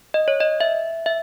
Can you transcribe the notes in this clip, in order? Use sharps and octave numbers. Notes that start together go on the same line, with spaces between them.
D#5
C#5
D#5
E5
E5